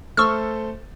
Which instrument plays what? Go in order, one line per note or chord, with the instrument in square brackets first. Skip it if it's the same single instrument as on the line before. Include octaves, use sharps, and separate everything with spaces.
[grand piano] A3 A4 C5 [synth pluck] C#6 E6 F6